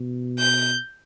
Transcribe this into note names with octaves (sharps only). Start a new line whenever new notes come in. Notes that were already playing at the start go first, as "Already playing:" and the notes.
Already playing: B2
G6